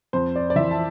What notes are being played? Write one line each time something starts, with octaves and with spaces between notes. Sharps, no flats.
F2 C5
D5
D5
E3 E5
A5